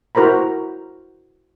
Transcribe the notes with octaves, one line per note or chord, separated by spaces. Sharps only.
E4 F#4 A#4 C5 A#5 B5